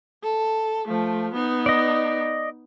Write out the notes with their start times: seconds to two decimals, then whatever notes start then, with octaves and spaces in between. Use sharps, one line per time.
0.23 A4
0.88 F3 A3
1.34 B3 D#4
1.66 D5 D#5